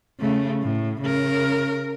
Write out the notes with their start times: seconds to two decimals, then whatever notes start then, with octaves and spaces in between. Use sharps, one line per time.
0.20 C#3 A3
0.63 A2
1.02 C#3 A#4